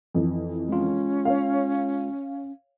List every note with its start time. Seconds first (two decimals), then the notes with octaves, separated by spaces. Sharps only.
0.15 F2 E3
0.69 G#3 C#4 F4
1.25 C#5 F5